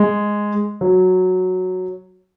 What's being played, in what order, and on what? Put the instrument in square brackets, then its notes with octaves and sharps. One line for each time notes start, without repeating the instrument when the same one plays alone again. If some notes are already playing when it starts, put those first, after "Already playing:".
Already playing: [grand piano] G#3
F#3